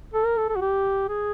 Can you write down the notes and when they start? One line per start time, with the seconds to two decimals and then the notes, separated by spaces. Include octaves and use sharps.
0.14 A4
0.26 A#4
0.37 A4
0.49 A4
0.56 F#4
0.62 G4
1.09 G#4